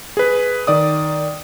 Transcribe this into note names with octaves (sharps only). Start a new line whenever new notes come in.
G#4 B4
D#3 D5 D#6